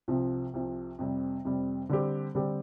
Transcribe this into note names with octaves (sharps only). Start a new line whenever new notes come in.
C2 C3 F3
C2 C3 F3
F2 C3 G3
F2 C3 G3
D3 G3 C4 G4
D3 G3 C4 G4